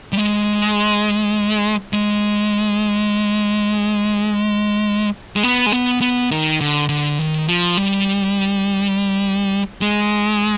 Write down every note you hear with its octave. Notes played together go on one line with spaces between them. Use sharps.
G3
G#3
G#3
G#3
B3
G#3
B3
B3
D#3
D3
D3
D#3
F3
G3
G#3